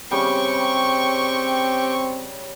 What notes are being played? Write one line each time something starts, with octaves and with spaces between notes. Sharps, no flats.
C#3 G3 C4 G4 G5 C#6